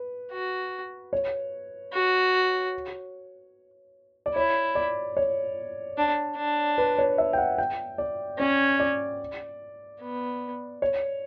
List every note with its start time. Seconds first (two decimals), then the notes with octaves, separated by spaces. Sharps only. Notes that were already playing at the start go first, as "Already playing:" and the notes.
Already playing: B4
0.32 F#4
1.13 C#5
1.94 F#4
4.26 D5
4.35 E4 C#5
4.75 D5
5.17 C#5
5.98 D4
6.37 D4
6.78 B4
6.98 C#5
7.18 E5
7.33 G5
7.38 F#5
7.58 G5
7.98 D5
8.39 C#4 D5
8.80 D5
10.01 B3
10.82 C#5